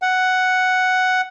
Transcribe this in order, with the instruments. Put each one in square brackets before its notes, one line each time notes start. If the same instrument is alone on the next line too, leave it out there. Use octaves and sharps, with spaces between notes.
[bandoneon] F#5